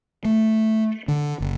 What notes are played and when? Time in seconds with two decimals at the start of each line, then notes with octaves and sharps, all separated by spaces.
0.25 A3
1.08 D3
1.40 F#1